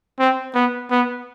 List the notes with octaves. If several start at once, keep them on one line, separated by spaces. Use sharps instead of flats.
C4
B3
B3